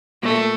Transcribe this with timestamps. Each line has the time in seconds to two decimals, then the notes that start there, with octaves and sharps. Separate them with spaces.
0.23 A#2 A3